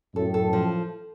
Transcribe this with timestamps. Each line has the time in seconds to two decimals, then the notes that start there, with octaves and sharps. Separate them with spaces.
0.15 F#2 A2 A4
0.34 A4
0.53 F3